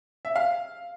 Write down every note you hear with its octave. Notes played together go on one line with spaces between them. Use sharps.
E5
F5